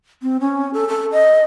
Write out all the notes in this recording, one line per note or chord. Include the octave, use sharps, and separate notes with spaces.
C4
C#4
A4
A4
D#5